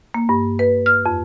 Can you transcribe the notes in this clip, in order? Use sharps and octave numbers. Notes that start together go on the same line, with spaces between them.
A#3
G2
B4
F6
F2